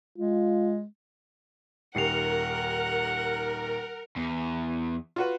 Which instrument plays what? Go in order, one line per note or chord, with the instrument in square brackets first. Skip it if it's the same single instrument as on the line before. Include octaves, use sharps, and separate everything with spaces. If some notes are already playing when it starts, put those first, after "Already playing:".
[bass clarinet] G#3 [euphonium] F4
[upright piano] D#1 D#2 C7 [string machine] A#4 [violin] F#5 [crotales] C#7 F7
[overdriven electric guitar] E2
[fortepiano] F4 F#4 B4